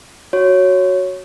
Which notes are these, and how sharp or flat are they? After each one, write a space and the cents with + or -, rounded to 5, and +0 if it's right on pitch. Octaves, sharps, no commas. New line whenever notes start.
F#4 +0 C#5 +0